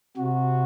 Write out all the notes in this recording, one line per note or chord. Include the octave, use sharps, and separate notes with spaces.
C3 F#4